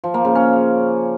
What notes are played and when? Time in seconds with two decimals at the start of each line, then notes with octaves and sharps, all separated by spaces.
0.04 F3
0.14 A#3
0.25 C#3
0.35 C#4